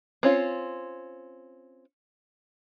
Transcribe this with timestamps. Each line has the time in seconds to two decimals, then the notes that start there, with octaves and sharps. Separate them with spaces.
0.23 C4 C#4 F4